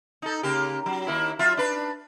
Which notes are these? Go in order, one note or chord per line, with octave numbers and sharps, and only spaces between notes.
D#4 A4
C#3 A#3 G4
F#3
D#2 A#3 E4
F#3 F4 E5
D4 B4